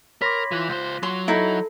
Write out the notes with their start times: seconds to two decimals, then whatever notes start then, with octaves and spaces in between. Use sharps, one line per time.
0.22 A#4 C#5 B5 C6 D6 A#6 B6
0.51 E3 F4 F#6
0.69 C#2 C5
1.03 F#3 C6
1.28 D#4 E4 A4 C7